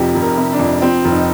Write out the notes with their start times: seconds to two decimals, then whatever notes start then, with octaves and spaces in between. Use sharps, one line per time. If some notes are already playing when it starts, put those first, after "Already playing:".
Already playing: F1 F2 C3 F3 G4
0.15 F1
0.22 A#4
0.38 C3
0.52 D4
0.59 F2
0.82 F3 C4
1.05 F1
1.12 D#4